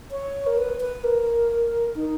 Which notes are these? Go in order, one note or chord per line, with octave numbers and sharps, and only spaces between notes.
C#5
A#4
B4
B4
A#4
D#4